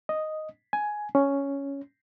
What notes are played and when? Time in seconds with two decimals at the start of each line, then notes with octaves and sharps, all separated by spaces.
0.09 D#5
0.73 G#5
1.15 C#4